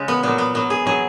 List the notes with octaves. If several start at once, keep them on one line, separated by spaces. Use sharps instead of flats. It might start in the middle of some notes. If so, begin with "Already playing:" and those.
Already playing: C#3 G#3
B3
A#2 F#3 B3
B3
B2 F#3 B3
G#4
B2 F#3 G#4